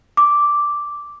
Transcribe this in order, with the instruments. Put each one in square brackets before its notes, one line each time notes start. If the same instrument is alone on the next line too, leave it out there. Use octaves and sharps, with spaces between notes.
[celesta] D6